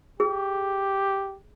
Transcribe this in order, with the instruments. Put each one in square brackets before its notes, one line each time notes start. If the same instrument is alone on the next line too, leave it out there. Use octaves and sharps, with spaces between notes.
[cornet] G4 [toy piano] G#4